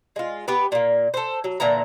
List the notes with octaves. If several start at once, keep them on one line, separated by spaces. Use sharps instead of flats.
G#3 F4
B3 G4 B4
A#2 A#3
A4 C5
F#3
A#2 D3 E3 A#5